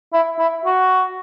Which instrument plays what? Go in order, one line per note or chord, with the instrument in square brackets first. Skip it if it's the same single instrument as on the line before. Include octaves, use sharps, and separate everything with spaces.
[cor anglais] E4
E4
F#4